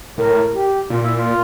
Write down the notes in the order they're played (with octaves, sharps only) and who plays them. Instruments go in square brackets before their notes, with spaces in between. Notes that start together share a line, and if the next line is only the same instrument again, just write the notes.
[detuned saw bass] A2 [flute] A#4
[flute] G4
[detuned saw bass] A#2 [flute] F4
[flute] E4
F4